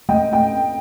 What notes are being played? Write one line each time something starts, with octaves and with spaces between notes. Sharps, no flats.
A3 D#5 G5
G5